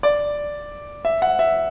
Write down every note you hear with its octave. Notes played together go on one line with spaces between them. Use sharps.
D5
E5
F#5
E5